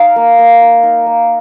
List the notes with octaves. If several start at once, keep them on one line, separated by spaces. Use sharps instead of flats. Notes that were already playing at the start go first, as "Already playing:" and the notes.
Already playing: D#4 F5
A#3
A#3
D#4
D#4
A#3